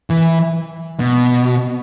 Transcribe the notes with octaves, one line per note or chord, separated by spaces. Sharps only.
E3
B2